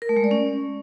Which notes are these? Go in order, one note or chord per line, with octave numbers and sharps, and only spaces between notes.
A#4
A3
G#3
D5
C#4